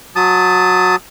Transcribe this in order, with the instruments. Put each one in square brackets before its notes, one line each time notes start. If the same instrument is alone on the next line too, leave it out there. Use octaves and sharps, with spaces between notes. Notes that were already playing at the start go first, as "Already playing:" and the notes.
[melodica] F#3 A5 D#6